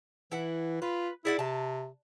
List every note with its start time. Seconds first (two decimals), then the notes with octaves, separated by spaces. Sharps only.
0.32 E3 E4 F#5
0.82 F4 B4
1.25 E4 G#4 D5 F#5
1.39 C3 A5